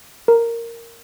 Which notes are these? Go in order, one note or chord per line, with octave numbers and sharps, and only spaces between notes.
A#4